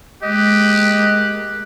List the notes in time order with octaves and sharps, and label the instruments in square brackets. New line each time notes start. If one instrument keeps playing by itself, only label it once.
[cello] G#3 A#3 [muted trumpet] G4 [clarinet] D#5 [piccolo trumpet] F#6